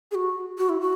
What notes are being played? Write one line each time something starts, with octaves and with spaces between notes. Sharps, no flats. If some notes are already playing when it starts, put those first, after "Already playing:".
G#4
F#4
F#4
E4
F#4